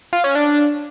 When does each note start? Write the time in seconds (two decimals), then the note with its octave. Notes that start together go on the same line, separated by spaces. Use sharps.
0.13 F4
0.24 C#4
0.35 D4